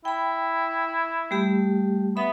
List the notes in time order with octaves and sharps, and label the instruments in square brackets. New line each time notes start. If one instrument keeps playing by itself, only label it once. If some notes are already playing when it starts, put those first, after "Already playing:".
[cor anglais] E4 [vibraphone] G5 B5
[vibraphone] G3 A3 G4
[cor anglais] B3 [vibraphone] E5 B5